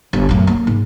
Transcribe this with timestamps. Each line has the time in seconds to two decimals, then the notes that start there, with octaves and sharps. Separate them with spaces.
0.13 G1
0.29 F#2 A2
0.47 A#3
0.67 G#2